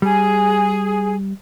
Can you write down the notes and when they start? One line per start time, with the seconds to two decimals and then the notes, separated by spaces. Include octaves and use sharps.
0.02 G3 G#4